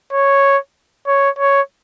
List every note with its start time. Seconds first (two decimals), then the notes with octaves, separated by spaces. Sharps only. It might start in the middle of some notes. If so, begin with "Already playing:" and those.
0.13 C#5
1.07 C#5
1.39 C#5